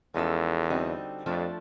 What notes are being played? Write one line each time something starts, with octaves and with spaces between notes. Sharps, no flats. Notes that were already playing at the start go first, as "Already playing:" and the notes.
E2 F3 G#3 C#4 F4 A4
D3 G3 C4 D#4 F#4
F2 F3 A3 D4 F4